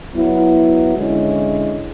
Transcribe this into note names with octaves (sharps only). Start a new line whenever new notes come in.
F#3 B3 E4
D3 G#3 C#4 E4